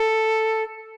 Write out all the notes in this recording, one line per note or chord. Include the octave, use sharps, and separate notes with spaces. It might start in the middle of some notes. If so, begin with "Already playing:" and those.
Already playing: A4